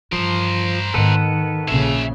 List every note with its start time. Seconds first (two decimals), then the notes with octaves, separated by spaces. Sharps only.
0.12 G2 E3 F3 A#4 C5
0.94 G#2 D#3 B3 A4 B4 F#5
1.68 A#1 C#3 G#4 E5